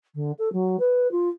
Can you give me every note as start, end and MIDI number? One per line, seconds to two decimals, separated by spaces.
0.15 0.32 50
0.39 0.52 69
0.53 0.77 54
0.80 1.10 71
1.12 1.29 65